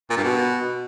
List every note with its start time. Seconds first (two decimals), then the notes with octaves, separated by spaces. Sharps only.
0.10 A#2
0.17 G2
0.24 B2